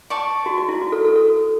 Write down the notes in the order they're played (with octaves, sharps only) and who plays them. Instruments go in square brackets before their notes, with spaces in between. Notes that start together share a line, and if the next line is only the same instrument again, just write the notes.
[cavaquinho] D5 A5 C#6
[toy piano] F#4
F#4
E4
F#4
A4
A4
A4